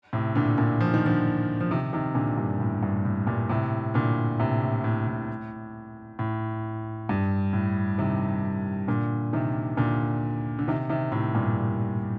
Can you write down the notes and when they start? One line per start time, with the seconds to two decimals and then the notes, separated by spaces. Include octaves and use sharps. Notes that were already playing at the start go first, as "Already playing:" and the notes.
0.13 A2 C3
0.35 A#2 D3
0.58 A#2 D3
0.81 F3
0.94 D#3
1.06 D3 F3
1.60 F3
1.71 C3 D#3
1.93 C3 D#3
2.15 A#2 D3
2.38 G2
2.60 A2
2.83 G2
3.05 A2
3.27 G2 A#2
3.49 A2 C3
3.94 A#2 D3
4.39 A2 C3
4.62 A2
4.84 A2
5.07 A2
6.19 A2
7.09 G2
7.53 A2
7.98 C3 D#3
8.88 A#2 D3
9.33 C3 D#3
9.77 A#2 D3
10.59 D3
10.68 C3 D#3
10.89 C3 D#3
11.12 A2 C3
11.35 G2 A#2